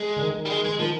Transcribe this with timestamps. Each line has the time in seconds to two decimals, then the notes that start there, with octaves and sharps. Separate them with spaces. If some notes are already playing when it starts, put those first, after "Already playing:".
Already playing: G#3
0.17 D3
0.20 D#3
0.36 D#3
0.45 G3
0.50 G#3
0.64 G#3
0.79 D#3 F3